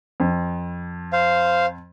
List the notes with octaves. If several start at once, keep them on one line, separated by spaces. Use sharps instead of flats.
F2
C5 F5